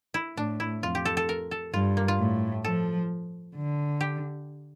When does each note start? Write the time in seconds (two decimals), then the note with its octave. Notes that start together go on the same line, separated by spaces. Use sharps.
0.14 E4
0.37 A2 D4
0.60 E4
0.82 F2 F4
0.95 G4
1.05 A4
1.17 A4
1.29 A#4
1.51 A4
1.74 G2 F4
1.97 A#3
2.08 F4
2.19 A2
2.64 F3 A4
3.55 D3
4.01 G4